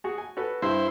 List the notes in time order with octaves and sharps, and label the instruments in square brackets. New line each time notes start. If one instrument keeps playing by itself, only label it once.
[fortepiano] F#4 G#4
G#5
F#4 A4 B4
[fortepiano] G2 [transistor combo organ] E4 C5